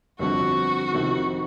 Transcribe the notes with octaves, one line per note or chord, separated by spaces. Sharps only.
G1 F2 D3 F#4
F1 F2 C3 D#3